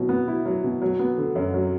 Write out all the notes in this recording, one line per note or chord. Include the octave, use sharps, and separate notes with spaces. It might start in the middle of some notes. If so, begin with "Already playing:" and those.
Already playing: B2 F#3 E4
B3
E4
F#3
B2
F#3
B3
D3
F#2
F#3